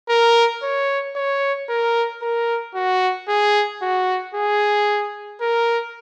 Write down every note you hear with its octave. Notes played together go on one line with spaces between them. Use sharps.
A#4
C#5
C#5
A#4
A#4
F#4
G#4
F#4
G#4
A#4